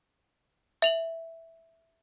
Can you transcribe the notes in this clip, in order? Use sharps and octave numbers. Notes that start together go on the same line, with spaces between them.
E5 F7 F#7